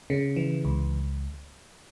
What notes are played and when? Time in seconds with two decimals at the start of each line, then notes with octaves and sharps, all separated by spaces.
0.10 C#3
0.36 E3
0.65 C#2